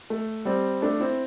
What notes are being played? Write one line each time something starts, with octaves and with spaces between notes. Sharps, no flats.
A3
G3 C4
A3 D4
C4 E4